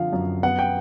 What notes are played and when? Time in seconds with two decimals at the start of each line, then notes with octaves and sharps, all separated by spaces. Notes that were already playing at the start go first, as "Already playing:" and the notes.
Already playing: D3 F3 F5
0.13 F#2
0.43 B3 F#5
0.59 G5